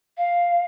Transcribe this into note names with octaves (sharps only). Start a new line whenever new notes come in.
F5